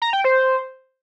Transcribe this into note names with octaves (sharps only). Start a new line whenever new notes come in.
A#5
G5
C5